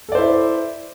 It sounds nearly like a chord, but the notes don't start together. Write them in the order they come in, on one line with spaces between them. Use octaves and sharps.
A4 D5 C5 E4